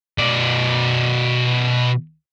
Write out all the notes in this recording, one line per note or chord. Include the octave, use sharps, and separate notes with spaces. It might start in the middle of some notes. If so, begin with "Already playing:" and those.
B2 D5